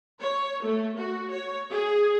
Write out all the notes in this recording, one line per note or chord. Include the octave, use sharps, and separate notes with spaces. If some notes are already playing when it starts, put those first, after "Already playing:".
C#5
A3
F#4
C#5
G#4